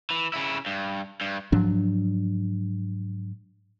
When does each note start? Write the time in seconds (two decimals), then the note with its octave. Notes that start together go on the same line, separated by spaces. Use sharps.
0.11 E3
0.34 C#3 E4
0.66 G2
1.21 G2
1.52 G#2 F3 F#3 D4